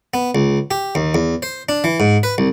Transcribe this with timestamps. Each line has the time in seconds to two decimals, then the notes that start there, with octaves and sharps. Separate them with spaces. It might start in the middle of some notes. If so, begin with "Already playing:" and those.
0.14 B3
0.35 C#2
0.71 G4
0.95 D#2
1.15 E2
1.43 C5
1.69 D4
1.84 E3
2.00 G#2
2.23 B4
2.38 C2